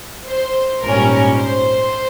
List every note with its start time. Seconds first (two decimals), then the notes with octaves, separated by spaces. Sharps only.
0.30 C5
0.83 A#1 G#2 G3 C#4 A#4
1.35 C5